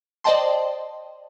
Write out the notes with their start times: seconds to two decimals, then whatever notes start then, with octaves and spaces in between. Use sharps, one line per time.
0.24 C5 D5 D#5 G5 A5 C6